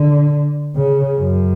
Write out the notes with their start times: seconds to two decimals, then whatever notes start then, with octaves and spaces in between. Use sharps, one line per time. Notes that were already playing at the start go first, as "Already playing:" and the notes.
Already playing: D3
0.76 C#3
1.20 F#2